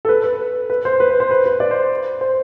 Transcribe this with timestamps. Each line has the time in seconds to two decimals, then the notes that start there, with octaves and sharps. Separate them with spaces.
0.05 A4
0.09 B4
0.24 B4
0.70 B4
0.85 C5
1.00 B4
1.11 B4
1.20 C5
1.31 B4
1.46 B4
1.60 D5
1.71 C5
2.21 C5